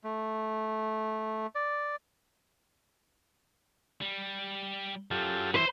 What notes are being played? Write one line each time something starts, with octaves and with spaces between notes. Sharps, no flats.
A3
D5
G3
F#2 F#3 F4 G4 A4
E3 B4 C5